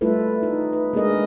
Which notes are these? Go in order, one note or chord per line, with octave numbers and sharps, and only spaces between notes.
G3 A3 E4 F4 A4 B4
D#4
B4
G#3 A#3 D4 G#4 A#4 D#5